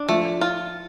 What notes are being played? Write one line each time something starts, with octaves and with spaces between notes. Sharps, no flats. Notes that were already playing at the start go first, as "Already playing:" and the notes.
Already playing: D4
F3 A3
F4